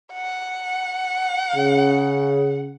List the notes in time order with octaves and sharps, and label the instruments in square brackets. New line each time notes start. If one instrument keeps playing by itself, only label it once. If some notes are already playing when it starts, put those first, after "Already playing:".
[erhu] F#5
[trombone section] C#3